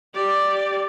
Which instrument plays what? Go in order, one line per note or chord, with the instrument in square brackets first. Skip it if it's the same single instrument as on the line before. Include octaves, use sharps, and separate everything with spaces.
[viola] G4 D5